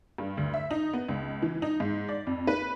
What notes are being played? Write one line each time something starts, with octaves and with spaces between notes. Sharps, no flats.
G2
D2
E5
D#4
B3
C#2
E3
D#4
G#2
D5
F2
B4